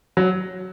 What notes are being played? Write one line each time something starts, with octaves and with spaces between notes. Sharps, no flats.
F#3